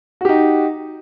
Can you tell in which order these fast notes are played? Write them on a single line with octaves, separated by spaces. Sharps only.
F#4 G4 D#4